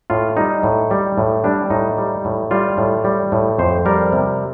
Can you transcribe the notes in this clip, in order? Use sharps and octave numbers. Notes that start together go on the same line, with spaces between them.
A2 F4
G3 D#4
A2
G3
A2
G3 D4
A2 D#4
G3
A2
G3 F4
A2
G3
A2
F2 C5
G3 A#4
C3